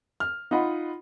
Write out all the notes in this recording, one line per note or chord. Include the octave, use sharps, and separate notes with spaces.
F6
D#4 F4 D#5 F#5 B5